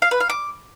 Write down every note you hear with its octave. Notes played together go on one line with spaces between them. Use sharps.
F5
B4
F5
D6